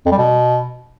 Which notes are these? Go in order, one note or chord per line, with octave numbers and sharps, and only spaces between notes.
F2
G3
B2